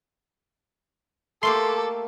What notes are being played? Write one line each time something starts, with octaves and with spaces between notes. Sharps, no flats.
A3 A#3 G4 A4 C6